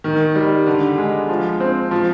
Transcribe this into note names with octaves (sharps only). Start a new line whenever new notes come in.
D#3
G3
D3
G#3
F3
C4
F3